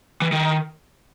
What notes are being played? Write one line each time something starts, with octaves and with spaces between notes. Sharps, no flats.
E3
D#3